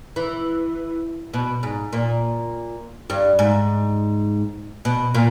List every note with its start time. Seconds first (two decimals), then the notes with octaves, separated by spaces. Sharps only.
0.16 E3
1.34 B2
1.63 G#2
1.93 A#2
3.10 G2
3.39 G#2
4.85 B2
5.15 A#2